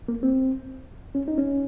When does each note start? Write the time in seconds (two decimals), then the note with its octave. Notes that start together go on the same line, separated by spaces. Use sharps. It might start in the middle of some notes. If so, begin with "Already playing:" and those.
0.08 A#3
0.23 C4
1.15 C#4
1.28 D#4
1.38 C#4